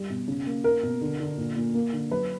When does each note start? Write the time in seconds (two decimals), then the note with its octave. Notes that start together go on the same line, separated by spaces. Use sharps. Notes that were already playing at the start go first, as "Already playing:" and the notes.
Already playing: G3
0.10 B2
0.28 C#3
0.46 A#3
0.64 A#3 A#4
0.83 B2
1.01 D3
1.20 D3
1.38 A#2
1.56 A#2
1.74 A#3
1.93 D3
2.11 F#3 B4